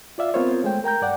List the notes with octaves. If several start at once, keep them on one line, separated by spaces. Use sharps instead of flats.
F4 D5 E5 F5
B3 C4 F4 A#4 C5 C#5
G#3 A3 C5 G5
A#4 G5 A#5 G6
G2 D5 F#5 G5